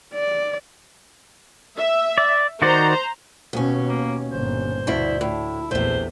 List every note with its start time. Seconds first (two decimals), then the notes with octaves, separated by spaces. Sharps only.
0.14 D5
1.77 E5
2.18 D5
2.62 D#3 F#4 C5 D5 A#5
3.53 D#2 B2 C#4
3.88 A#3
4.31 G1 A#2 C5
4.87 D2 G2 B2 E4
5.21 A2 E4
5.71 A#1 E2 C3 A3 C5